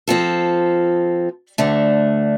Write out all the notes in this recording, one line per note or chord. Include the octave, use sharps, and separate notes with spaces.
F3 C4 F4 A4
D2 D3 A3